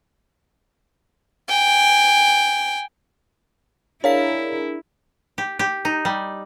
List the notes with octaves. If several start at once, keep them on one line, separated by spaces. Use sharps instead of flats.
G5 G#5
D4 E4 G#4 A#4 C#5 F5 B6
G4
G4
D#4
G3